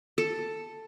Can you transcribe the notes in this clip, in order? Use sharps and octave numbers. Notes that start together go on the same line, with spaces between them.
A4